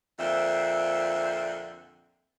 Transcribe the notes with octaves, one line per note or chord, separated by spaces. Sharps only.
F2 A#2 D3 C5 E5